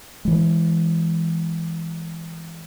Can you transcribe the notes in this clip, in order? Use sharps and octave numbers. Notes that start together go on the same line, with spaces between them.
E3 G#3